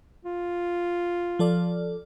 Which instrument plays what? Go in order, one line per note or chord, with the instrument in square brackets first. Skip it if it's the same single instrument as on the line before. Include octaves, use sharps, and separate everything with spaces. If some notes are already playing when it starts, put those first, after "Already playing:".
[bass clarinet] F4
[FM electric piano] F3 A4 D5